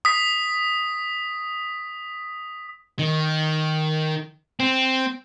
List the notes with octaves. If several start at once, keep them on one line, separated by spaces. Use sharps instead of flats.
D#6 B6
D#3
C4